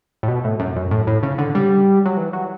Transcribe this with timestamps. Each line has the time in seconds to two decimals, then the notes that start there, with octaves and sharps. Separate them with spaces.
0.23 A2
0.28 B2
0.44 A2
0.60 F#2
0.76 F#2
0.91 A2
1.07 A2
1.23 C#3
1.38 D3
1.55 G3
2.06 F#3
2.17 E3
2.33 F#3